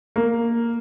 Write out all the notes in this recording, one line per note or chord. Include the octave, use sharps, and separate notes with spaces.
A#3